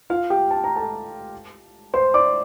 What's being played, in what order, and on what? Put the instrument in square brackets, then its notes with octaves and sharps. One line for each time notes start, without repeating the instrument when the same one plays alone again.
[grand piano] F4 F5
G4 G5
A5
A#5
A4 A5
C5 C6
D5 D6